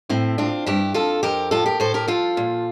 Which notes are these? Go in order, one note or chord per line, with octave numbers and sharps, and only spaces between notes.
A2 C4 E4
C4 D4 F4
G2 E4 G4
F2 F4 A4
F2 G4 A#4
A2 F4 A4
G4 A#4
A2 A4 C5
G4 A#4
F3 F4 A4
A#2